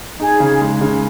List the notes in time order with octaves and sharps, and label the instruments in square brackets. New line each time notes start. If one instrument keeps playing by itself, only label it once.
[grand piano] D#4 [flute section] G#4
[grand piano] C#3
G#3
C#3